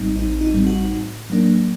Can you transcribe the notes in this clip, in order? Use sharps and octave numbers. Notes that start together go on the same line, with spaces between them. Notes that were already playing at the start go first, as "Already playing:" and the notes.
Already playing: A1 A2 G3 C4 D#4
A1 D#4
D#4
A2 G3 C4
F#4
A2
F#3 A#3 D4